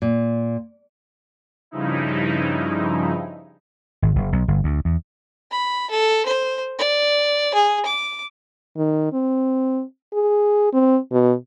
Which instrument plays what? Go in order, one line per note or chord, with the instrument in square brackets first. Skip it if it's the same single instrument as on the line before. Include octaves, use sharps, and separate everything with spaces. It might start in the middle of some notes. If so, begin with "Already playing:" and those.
[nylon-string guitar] A#2
[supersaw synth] G2 C#3 F3 D#4 E4
[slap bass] G#1
F#1
B1
G1
D2
E2
[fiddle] B5
A4
C5
D5
G#4
D6
[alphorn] D#3
C4
G#4
C4
B2